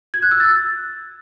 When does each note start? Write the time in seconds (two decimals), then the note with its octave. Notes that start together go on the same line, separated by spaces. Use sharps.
0.14 G#6
0.22 F#6
0.31 E6
0.40 A6